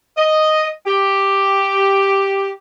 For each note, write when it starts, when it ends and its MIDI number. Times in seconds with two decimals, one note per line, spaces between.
0.17 0.67 75
0.86 2.50 67